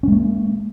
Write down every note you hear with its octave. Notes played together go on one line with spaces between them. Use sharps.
G#3 A#3 C#4